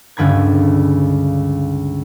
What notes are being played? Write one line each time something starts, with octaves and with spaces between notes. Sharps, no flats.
C#2 G2 D3 B5 G#6